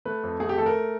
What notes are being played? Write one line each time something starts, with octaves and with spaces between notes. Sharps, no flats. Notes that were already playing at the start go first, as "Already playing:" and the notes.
A3 B4
F2
A3 G#4
G4
A3 A4
A#4